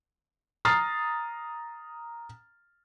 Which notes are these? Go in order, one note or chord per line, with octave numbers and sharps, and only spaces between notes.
A#5 D#6 F6 A6 C7